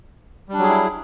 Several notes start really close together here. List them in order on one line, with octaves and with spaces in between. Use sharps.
G3 D4 F#3 G#4 E4